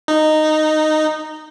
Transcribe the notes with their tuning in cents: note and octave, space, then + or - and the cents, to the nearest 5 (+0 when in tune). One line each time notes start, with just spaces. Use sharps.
D#4 -10